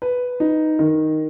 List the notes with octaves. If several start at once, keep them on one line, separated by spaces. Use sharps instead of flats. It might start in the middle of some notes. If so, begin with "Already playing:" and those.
B4
D#4
D#3